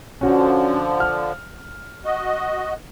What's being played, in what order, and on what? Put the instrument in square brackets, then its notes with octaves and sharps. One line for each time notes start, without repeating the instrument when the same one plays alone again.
[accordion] D3 F3 [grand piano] C#4 F#4
[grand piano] F6
[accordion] F#4 D#5